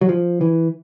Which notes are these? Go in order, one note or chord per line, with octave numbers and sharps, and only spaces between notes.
F#3
F3
E3